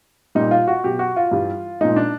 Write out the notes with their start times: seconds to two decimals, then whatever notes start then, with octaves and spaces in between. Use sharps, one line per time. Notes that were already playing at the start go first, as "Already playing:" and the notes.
0.35 A#2 G3 D#4
0.51 F4
0.67 F#4
0.84 B2 F#3 G4
0.99 F#4
1.16 F4
1.31 G2 E3 G3
1.81 A#2 F3 G#3 D#4
1.96 D4